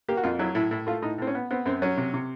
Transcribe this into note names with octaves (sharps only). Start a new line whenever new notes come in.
A#3 G4
F#4
F2 F4
F#3 E4
A2 E4
A2 E4
A3 F4
A2 D#4
A2 C4
C#4
B3
B3 C4
F#2 C4
F#3 C#4
C3
C3